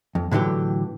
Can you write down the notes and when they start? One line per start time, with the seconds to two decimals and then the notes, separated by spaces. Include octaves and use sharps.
0.15 F2
0.31 A2 D3 E3 F#3 G4